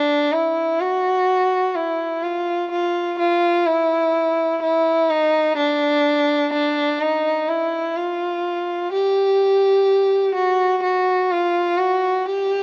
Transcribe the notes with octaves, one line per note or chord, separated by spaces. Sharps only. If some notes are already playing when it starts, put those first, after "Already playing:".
Already playing: D4
E4
F#4
E4
F4
F4
F4
E4
E4
D#4
D4
D4
D#4
E4
F4
G4
F#4
F#4
F4
F#4
G4